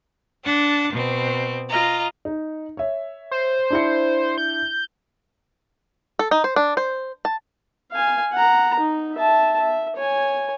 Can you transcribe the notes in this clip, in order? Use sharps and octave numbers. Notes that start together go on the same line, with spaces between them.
D4 F#5 A5
B2 C4
F4 D#5 A#5
D#4
C#5 E5
C5
D4 E4 C#7
G6
A4
D#4
C5
D4
C5
A5
F5 G#5
F#5 A#5
D#4
E5 A5
E5
C#5 G#5